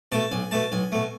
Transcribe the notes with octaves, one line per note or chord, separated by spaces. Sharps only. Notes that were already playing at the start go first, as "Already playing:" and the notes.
B2 A3 A5
B1 G#5
B2 A3 A5
B1 G#5
B2 A3